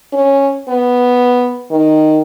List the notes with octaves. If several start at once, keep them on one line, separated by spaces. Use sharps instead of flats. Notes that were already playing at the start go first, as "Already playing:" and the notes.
C#4
B3
D#3